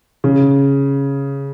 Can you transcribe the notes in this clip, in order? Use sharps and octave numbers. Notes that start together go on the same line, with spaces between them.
C#3